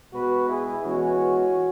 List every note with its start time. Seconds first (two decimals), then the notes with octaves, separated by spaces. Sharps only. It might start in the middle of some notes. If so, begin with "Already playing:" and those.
0.12 B2 G#3 B3 F#4 B4
0.48 E4 G#4
0.83 E3 G#3 B3 C#4 F#4